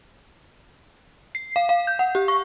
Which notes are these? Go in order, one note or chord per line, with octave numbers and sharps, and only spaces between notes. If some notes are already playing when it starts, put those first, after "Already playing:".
C7
F5
F5
G6
F#5
G4
C#6